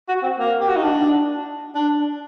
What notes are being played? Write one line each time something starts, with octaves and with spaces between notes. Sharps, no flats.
F#4
C4
A#3
G4
F#4
D#4
D4
D4